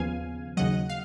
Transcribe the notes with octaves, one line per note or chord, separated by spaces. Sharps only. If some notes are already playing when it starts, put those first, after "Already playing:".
Already playing: D#2 C#3 F3 B3 F5 G#5
D#2 C#3 F#3 D#5 F#5
F5